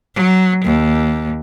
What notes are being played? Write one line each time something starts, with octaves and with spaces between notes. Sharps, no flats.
F#3
D#2